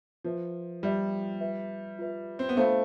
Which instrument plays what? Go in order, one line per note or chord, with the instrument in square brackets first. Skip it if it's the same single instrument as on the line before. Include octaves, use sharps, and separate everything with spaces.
[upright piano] F3 [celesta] F4 B4 E5
[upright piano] G3 [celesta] F4 B4 E5
[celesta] F4 B4 E5
F4 B4 E5
[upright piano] C4
B3
[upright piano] A3 [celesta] D4 F4 C5 F5 B5